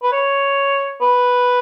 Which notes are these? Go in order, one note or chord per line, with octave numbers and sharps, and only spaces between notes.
B4
C#5
B4